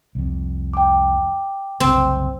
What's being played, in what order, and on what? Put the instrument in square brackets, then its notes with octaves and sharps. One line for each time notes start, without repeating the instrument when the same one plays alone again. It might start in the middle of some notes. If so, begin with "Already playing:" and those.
[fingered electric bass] C2 F2
[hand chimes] G5 D6
[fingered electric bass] F#1 C2 [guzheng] C4